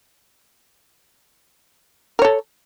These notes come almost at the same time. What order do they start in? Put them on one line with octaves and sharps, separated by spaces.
A#4 C#5 A4